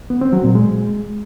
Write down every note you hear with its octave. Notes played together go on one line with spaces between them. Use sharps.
B3
C4
F#3
A#2
G#3